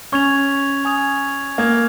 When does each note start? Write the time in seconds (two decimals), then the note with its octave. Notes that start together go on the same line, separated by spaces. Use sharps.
0.12 C#4 C#6 G#6 F7
0.85 G#5 D#6 G#6 F7
1.58 A#3 D#6 G#6 F7